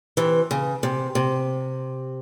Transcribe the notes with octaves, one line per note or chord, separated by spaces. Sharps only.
C3 E3
C#3
C3
C3